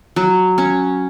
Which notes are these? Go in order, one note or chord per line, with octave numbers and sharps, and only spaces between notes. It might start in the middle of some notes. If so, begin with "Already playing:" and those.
F#3
C#4